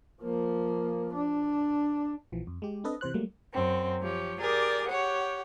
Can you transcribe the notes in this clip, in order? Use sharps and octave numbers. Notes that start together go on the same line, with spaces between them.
F3 A#3
D4
A#1 E3 F3
F2
G#3 G4
C4 D4 A4 B4 D#5
C3 E3 C5 F#6
F#3 G3 A3 A#3
F#2 C4
F3 G4 C#5
G4 G#4 A#4 D5
G4 C#5 F#5